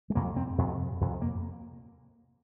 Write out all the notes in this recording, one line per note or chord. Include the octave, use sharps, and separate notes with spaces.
G#3
F2 C3 A#3
C4
F2 C3
F2 C3
A#3